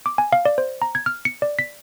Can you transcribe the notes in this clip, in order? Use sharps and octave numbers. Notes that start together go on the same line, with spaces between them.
D6
G#5
F5
D5
C5
A#5
G#6
F6
C#7
D5
B6